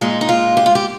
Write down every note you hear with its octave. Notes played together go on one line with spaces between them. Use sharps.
A#2 G#3 D#4
D#4
F4
G4
F4
G4